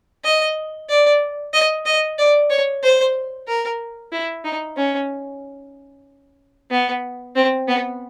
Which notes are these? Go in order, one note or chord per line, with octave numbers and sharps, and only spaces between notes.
D#5
D5
D#5
D#5
D5
C#5
C5
A#4
E4
D#4
C#4
B3
C4
B3